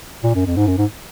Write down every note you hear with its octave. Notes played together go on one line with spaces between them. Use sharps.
A#2
F#2
F2
G#2
F#2
G#2